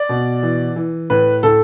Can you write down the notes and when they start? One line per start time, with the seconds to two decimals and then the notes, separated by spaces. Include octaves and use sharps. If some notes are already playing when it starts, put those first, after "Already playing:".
Already playing: D5
0.09 B2
0.43 E3
0.76 E3
1.10 A2 B4
1.43 A2 A4